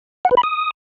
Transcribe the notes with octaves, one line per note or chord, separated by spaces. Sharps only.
F#5
B4
B5
D#6